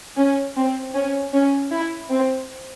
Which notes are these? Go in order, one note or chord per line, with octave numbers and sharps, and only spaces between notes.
C#4
C4
C#4
C#4
E4
C4